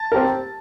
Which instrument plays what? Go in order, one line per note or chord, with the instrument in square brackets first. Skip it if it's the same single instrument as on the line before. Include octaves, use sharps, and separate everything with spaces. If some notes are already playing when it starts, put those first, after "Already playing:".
Already playing: [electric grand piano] A5
[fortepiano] C4 G4 A#4